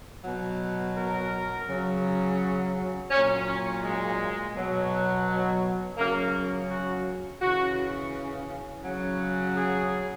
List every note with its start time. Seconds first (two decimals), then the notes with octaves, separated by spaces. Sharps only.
0.24 B2 F#3
0.96 A#4
1.67 C#3 F#3
3.11 A#2 F#3 C#4
3.47 C#4
3.82 G#3
4.54 B2 F#3
5.97 C#3 F#3 A#3
6.69 F#4
7.40 C#3 E3 F#4
8.84 C#3 F#3
9.56 G#4